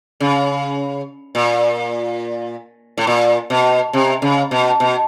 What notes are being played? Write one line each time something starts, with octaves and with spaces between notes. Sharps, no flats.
C#3
A#2
A2
A#2
B2
C3
C#3
B2
B2